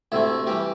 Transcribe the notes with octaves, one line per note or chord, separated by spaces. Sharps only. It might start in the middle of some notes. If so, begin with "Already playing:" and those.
D2 C3 A3 E4
E3 G3 G4